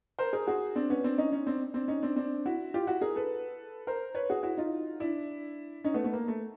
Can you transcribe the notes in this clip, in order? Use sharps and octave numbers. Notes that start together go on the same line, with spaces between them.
A#4 C5
G#4 A#4
F#4 G#4
C4 D4
B3 C#4
C4 D4
C#4 D#4
C#4 D#4
C4 D4
C4 D4
C#4 D#4
C4 D4
C4 D4
E4 F#4
F4 G4
E4 F#4
G#4 A#4
A4 B4
A#4 C5
B4 C#5
F#4 G#4
E4 F#4
D#4 F4
D4 E4
C#4 D#4
A3 B3
A3 B3
A#3
A3